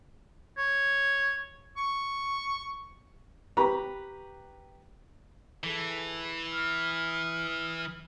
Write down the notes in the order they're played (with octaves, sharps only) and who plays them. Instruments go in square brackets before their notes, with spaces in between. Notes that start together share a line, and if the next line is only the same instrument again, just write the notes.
[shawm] C#5
C#6
[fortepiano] G4 B4 A#5 B5 C#6
[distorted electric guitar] E3 [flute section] G#4 A4
[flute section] D#6 F6